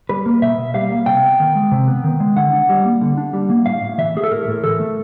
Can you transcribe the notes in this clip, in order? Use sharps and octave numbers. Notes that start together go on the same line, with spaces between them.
G3 B4
A#3
B2 E5
B2
G3 F5
A#3
C3 G5
B3
D#3
G#3
C3
B3
D#3
G#3
D3 F#5
D4
G3
A#3
D3
D4
G3
A#3
A2 F5
A2
E3 E5
A3 G#4
A4
A2 A#4
A2
E3 A4
A3